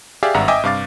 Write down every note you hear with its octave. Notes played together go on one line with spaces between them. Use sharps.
G4 G#4 D5 E5 F5
G#1 G2 E5 F#5 A#5
D#5 E5 G5 G#5 D6 D#6
G2 C3 F5 D6 A6